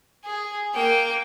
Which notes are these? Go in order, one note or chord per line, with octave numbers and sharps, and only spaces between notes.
G#4
A#3 G5